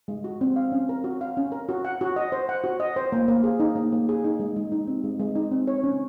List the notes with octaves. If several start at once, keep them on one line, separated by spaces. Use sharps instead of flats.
G#3
F#4
C4
F5
C#4
A#4
F#4
F5
C#4
A#4
F#4
F#5
F#4
D#5
C5
F#5
F#4
D#5
C5
A#3
A#3
G#4
D#4
A#3
A#3
G#4
D#4
G#3
G#3
D#4
C4
G#3
G#3
D#4
C4
C#5
C#4